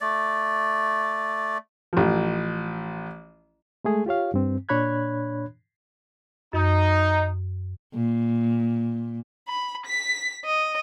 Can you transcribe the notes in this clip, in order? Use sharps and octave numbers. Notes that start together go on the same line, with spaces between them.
A3 D5
A1 F3
G#3 A3 G#4
F4 G4 C#5 F5
G2 C4
A#2 D4 C#5 B5 F#6 G#6
F#2 D#4
A#2
B5
B6
D#5